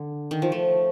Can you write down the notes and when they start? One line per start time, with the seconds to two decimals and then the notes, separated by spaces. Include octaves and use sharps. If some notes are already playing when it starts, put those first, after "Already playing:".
Already playing: D3
0.31 D#3
0.42 F3
0.52 A3